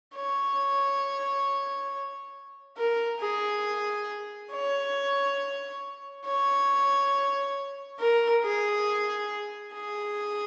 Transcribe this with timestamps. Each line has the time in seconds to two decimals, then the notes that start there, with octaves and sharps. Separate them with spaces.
0.16 C#5
2.78 A#4
3.20 G#4
4.52 C#5
6.26 C#5
8.00 A#4
8.44 G#4
9.74 G#4